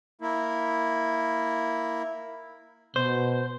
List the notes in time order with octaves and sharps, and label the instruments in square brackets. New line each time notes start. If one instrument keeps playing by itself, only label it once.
[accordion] A#3 E4
[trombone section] B2 [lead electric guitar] C5